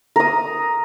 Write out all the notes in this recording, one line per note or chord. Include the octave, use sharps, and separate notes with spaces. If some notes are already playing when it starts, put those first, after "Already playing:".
A#4 D#6